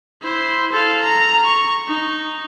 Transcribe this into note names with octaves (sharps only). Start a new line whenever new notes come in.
E4 C5
A4 F5
A#5
C#6
D#4